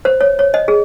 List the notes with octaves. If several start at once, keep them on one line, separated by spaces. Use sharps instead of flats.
C5
C#5
C#5
D#5
G#4